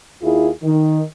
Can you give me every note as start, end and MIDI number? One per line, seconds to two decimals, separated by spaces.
0.23 0.48 39
0.23 0.48 64
0.23 0.48 65
0.23 0.48 68
0.63 1.01 51